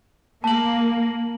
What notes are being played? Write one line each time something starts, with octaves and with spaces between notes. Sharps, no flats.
A#3 A5 F#7